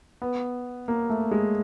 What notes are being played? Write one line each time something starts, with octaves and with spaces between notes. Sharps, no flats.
B3
A#3
A3
G#3